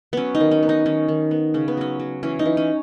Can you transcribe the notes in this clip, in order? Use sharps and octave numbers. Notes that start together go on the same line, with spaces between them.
F#3 B3 C#4
D#4
D#3
C#4
B3
D#4
D#3 C#4
D#3
B3
C#3 C#4
B3
F#3 C#4
F#3
E3 C#4
D#4
E3
C#4